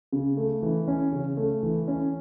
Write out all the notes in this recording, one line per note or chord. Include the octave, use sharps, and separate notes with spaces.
C#3
A3
E3
C#4
C#3
A3
E3
C#4